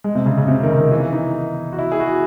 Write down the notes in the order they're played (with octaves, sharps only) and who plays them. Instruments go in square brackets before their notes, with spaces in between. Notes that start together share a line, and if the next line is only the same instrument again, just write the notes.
[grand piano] G#3
C3
C#3
C#3
C3
D#3
C#3
D#3
E3
D#4
F#4
E4
G#4
F#4